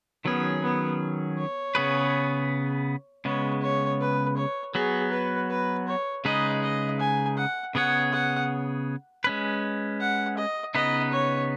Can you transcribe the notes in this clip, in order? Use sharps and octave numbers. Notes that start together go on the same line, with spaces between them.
D#3 F#3 B3 C#4 G#4
B3
C#5
C#3 B3 G#4 B4
C#3 G#3 B3 C#5
C#5
B4
C#5
F#3 B3 F#4 G#4
B4
B4
C#5
C#3 G#3 D#4 G#4 B4 D#5
D#5
G#5
F#5
C#3 B3 G#4 C#5 F#5
F#5
G#3 C#4 B4
F#5
D#5
C#3 B3 D#4 B4 D#5
C#5